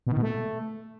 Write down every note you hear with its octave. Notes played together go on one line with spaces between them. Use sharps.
B2
D#3
B2
A3